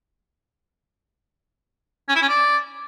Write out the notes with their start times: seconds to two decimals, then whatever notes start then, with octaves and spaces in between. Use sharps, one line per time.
2.08 C#4
2.15 E4
2.22 C#4
2.28 D5